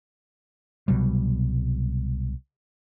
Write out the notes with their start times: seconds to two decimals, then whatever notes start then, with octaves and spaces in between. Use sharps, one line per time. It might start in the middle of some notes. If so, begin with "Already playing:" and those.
0.88 C2 B2 F#3 G3